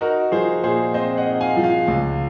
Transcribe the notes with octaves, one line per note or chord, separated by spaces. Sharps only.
D#4 F#4 A#4
F3 G#4 C5
A#2 G#4 C5
C4 C5 D#5
D#5 F#5
D#4
F5 G#5
F3
F5 G#5
C#2